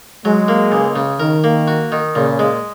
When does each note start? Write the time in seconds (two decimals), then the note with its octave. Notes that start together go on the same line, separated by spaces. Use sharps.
0.25 F#3 G#3
0.48 A#3
0.72 C#2
0.96 C#3
1.20 D#3 A#4
1.44 A#3
1.68 F#4
1.92 D#3
2.15 A#2 C#3
2.39 G#3